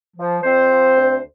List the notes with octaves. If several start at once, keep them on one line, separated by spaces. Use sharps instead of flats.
F3
F2 C4 C5
F3
D2